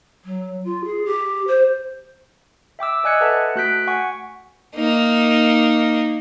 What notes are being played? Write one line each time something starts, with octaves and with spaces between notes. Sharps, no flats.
F#3
F4
G#4
G4
C5
E5 G5 D6 E6
D5 D#5 G#5 F#6 G#6 C#7
A4 B4 E5 F#5 A5
A3 F#4 F#6 G6 B6 D7
F#5 G#5 C#6
A#3 D#4